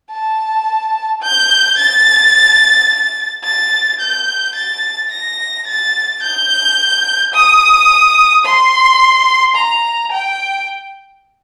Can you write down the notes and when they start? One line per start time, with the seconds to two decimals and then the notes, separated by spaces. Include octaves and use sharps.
0.11 A5
1.22 G6
1.78 A6
3.44 A6
4.00 G6
4.55 A6
5.11 A#6
5.67 A6
6.23 G6
7.34 D#6
8.45 C6
9.55 A#5
10.12 G5